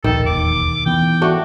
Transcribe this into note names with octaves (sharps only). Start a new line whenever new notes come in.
A#1 D#2 D#3 A4
E1 D#2 D6
E3 B3 G5
A3 D4 F#4